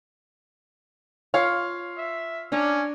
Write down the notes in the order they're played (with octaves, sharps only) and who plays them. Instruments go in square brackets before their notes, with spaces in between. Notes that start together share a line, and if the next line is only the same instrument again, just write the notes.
[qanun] F4 [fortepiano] C#5 F5
[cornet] E5
[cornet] C#4 [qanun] D4 A#5 D6